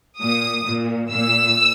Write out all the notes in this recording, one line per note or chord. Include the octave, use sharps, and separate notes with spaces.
A#2 D#6
A#2
A#2 E6